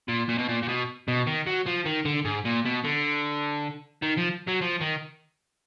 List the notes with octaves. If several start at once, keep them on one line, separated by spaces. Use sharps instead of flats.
A#2
A#2
B2
A#2
A#2
B2
B2
D#3
F#3
F3
D#3
D3
G#2
A#2
B2
D3
D#3
F3
F#3
F3
D#3